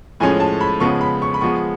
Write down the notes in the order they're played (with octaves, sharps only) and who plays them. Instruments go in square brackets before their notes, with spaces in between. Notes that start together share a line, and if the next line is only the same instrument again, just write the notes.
[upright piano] A2 F3 G#3 C#4 G#5
A5
B5
C#3 F3 G#3 B3 C#6
B5
C#6
B5
F3 G#3 B3 C#6